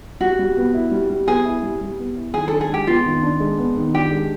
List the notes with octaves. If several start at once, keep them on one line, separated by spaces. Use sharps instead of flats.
G3 F#4
G3
B3
E4
G3
G3
B3 G#4
E4
G3
G3
B3
E4
D#3 G#4
D4 A4
G#4
G#3 G4
B3 F4
D#3
D4
G#3
B3
D#3
D4 G4
G#3